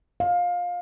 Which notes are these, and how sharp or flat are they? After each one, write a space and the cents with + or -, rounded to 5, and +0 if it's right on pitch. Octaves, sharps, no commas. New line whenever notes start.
F5 +20